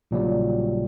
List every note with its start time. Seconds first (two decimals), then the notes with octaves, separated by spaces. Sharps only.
0.11 A#1 A#2 C#3 F#3 G3